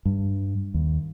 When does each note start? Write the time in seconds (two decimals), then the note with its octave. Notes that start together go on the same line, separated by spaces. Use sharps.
0.05 G2
0.74 D#2